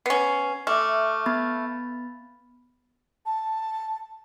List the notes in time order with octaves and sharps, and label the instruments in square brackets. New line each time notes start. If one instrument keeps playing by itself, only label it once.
[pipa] B3 C#4 [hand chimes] C7
[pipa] A3 [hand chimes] E5 D6 F6
[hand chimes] B3 B5 A6
[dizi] A5